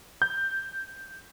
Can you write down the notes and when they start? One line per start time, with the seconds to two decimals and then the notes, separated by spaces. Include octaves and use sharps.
0.22 G6